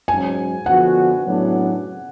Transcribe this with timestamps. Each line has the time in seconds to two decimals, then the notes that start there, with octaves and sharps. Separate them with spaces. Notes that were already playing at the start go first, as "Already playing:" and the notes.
0.08 G#2 F#3 C#4 G#5
0.66 D3 F3 B3 F#4 F#5
1.25 A2 F#3 B3 D4